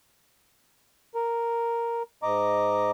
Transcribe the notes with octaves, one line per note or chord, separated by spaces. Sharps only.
A#4
G#2 D#5 A#5 D6